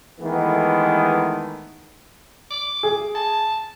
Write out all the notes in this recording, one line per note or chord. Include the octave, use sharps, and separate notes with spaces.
D#3 E3 G#3 A3 B3
D6
G#4
A5